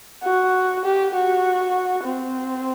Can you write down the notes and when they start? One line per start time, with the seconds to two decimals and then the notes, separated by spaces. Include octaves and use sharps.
0.23 F#4
0.85 G4
1.15 F#4
2.04 C4